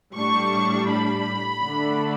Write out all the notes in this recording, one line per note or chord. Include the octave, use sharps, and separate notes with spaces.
A2 G3 D4 C#6
B5
D3 A3 D4